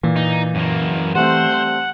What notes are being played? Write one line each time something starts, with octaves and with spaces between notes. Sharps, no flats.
A#2 E3
D#4
F#2 A#3
G3 A3 C4 C5 F#5